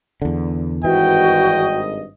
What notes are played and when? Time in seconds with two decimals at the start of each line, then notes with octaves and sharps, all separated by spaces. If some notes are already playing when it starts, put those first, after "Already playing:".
0.22 E2 D3
0.84 G#1 G2 E3 F#4 D#5 G5